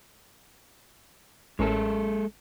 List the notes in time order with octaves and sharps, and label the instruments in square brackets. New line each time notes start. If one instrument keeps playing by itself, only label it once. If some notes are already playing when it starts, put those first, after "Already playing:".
[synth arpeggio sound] A1 C#4 A#4 [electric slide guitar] G#3 A4